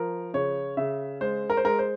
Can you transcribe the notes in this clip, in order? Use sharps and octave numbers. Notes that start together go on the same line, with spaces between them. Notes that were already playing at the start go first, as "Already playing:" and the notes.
Already playing: F3 A#4
C#3 C#5
C#3 E5
G#3 C5
A#4
C5
G#3 A#4
C5